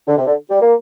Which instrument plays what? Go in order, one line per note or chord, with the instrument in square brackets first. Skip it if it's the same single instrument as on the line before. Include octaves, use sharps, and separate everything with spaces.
[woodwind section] D3
C3
D3
G3
A#3